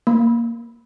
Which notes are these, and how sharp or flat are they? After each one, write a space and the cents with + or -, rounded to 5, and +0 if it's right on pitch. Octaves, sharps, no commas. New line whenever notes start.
A#3 +0 B5 -20